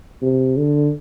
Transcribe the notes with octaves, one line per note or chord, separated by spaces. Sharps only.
C3
D3